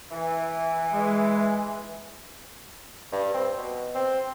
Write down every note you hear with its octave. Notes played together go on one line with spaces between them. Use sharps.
E3
G#3
G2
C4
B2
C4